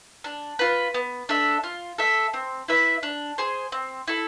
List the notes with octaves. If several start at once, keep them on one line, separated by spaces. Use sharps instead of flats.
D4
F4 B4
B3
D4 A4 E5
F4
A4 E5
C4
E4 B4 E5
D4
G#4 C5
C4
E4 A4